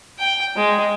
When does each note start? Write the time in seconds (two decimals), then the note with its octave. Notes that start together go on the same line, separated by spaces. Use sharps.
0.19 G5
0.56 G#3